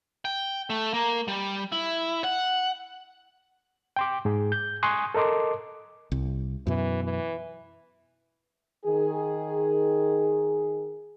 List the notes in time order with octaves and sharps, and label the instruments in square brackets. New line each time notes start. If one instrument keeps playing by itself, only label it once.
[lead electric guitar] G5
A3
A#3
G3
E4
F#5
[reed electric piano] G5 C6 D6
G#2 G#4
G6
G#5 C6 C#6 D#6 F#6
A4 A#4 D#5 C6 D6
[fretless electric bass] C2
[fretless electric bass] F#2 B2 [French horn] E3
[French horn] E3
[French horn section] D#3 G#4